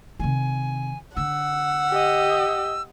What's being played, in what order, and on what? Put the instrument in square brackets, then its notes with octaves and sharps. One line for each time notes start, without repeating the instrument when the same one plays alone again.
[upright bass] C3 D#3 [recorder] G#5
[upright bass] D3 [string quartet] F#5 [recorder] E6
[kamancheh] G4 D#5